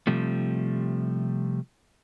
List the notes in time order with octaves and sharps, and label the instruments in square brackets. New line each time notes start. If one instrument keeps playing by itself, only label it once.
[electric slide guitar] C3 F3 G3 A3